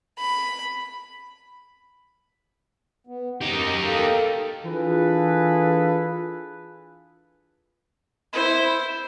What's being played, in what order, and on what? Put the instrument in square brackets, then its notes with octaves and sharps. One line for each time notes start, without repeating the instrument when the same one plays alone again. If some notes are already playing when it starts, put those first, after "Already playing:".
[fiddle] B5
[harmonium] B3
[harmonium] F#2 [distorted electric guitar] D#4 G4
[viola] A4 A#4 [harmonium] F5 G5
[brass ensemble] E3 D4 F4 G#4 A4 B4
[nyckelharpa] E4 C5